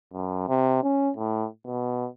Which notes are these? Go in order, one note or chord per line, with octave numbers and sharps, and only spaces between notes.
F#2
C3
C#4
A2
B2